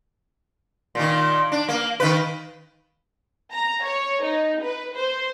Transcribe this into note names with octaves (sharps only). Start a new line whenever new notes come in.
A#2 D#3
D4
A#3
D#3 B4
A#5
C#5
D#4
B4
C5